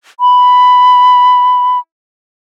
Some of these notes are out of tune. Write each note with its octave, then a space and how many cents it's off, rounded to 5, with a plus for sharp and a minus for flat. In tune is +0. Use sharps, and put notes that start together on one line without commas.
B5 +5